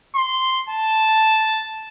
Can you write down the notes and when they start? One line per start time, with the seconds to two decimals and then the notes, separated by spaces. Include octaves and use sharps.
0.15 C6
0.69 A5